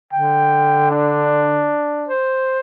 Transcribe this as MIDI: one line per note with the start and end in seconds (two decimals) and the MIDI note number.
0.13 1.74 50
0.13 0.89 79
0.91 2.11 62
2.08 2.59 72